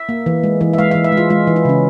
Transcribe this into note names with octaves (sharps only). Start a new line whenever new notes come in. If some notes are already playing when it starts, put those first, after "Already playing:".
Already playing: E5
A#3
E3
G#3
E3
E5
G#3 F5
E3 F5
E5
G#3
F4
G#3 F4
E3
E4
C#3 C#4